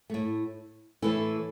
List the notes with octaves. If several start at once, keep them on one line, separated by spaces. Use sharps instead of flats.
A2 A3
A2 E3 A3 E4 A4